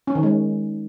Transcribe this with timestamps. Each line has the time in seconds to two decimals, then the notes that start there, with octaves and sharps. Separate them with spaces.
0.07 C#4
0.15 D#3
0.23 G#3